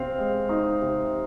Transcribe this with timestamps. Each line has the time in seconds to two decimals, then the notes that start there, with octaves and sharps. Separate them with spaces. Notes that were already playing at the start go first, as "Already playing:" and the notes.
Already playing: C3 C4 F5
0.19 G#3
0.49 D#4
0.81 C3